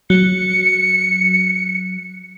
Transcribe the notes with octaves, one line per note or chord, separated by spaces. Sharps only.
F#3 C#7